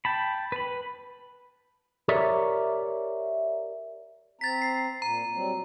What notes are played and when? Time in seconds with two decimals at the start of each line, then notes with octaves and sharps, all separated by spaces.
0.05 G5 A5 B5
0.52 B4 B5
2.08 G4 A#4 C#5 D5 E5
4.41 C4 A#5 A6 B6
4.62 C7
5.02 A#2 A#5
5.32 F#3 G3 C4